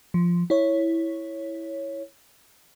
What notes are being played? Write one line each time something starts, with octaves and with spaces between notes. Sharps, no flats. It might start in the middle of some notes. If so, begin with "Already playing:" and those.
F3
E4 C#5